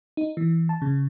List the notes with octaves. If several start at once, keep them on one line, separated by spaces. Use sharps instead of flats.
D#4
E3
A5
C#3